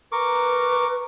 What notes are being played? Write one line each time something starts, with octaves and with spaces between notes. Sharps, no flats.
A#4 B4 C#6 D6